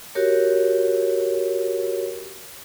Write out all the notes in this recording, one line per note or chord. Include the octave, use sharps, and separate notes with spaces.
F#4 G4 A#4 C#5